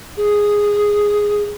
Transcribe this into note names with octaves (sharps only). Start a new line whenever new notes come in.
G#4